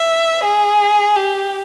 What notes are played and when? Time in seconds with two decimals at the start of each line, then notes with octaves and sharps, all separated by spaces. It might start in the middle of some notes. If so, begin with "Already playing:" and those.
Already playing: E5
0.43 G#4
1.16 G4